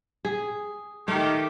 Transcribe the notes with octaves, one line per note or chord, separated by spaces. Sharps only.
G#4
D#3 A3 G4